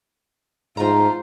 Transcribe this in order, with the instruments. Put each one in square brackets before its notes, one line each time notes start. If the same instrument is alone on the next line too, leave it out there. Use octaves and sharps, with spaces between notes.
[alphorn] G#2 [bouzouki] A3 A#5 [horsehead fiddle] F4 C5